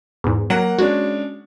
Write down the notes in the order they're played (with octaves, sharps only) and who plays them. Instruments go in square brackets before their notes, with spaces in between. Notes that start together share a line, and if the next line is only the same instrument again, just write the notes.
[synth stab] E2 G#2
[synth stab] F#3 [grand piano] A#3 F#5
[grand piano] G#3 C#4 D4 [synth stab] F#4